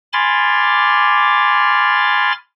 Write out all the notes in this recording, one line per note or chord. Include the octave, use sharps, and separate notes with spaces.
G#5 B5 C6 D6 F6 A6